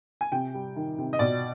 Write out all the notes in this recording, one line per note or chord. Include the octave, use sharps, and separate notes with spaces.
G#5
C3 G5
G3
D#3
C3
D#5
B2 D5